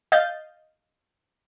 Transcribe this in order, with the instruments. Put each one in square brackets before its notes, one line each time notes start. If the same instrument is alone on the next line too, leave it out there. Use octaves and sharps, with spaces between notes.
[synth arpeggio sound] D#5 F5 G6 A6